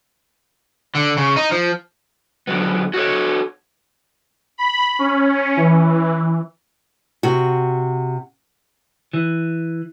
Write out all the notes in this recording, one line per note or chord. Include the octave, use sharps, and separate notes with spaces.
D3
C#3
D#4
F3
F#2 D3 F#3 B3
F#4 A4 C#5
B5
C#4
E3
C3 F#4
E3